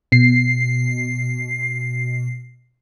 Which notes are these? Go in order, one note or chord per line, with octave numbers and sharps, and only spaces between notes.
B2 C7